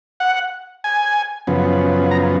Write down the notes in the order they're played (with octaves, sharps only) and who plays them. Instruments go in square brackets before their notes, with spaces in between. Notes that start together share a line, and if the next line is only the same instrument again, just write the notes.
[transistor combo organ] F#5
G#5
F#2 C#3 F3 B3
A#5